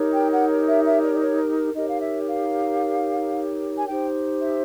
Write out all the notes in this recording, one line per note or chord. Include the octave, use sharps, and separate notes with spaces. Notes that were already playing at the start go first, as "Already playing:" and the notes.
Already playing: D#4 G4 A#4 C#5
G5
F#5
E5
E5
D5
D5
C#5
D#4 G4 A#4 C#5 D#5
F5
E5
F5
G#5
D#4 G4 C5 G5
E5